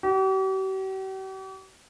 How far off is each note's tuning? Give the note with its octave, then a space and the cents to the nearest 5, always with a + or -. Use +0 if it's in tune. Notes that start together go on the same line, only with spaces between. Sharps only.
G4 -45